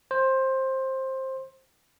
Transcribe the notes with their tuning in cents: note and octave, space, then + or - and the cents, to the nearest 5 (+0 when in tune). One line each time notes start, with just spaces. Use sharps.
C5 +15